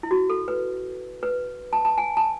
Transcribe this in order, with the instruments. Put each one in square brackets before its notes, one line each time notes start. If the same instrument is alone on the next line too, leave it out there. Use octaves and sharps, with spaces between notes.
[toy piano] E4
F#4
A4
B4
B4
A5
A5
G#5
A5